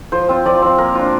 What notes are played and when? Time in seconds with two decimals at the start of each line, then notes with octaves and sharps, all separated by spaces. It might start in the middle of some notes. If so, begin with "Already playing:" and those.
0.12 F3 C5
0.29 C4 F4
0.45 F3 D5
0.62 C4 F4
0.78 A#3 A#4
0.95 D4 F4